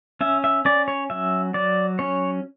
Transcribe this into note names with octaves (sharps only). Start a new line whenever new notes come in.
C#4 E5
E5
C#4 D5
C#5
F#3 E5
F#3 D5
C#4 C#5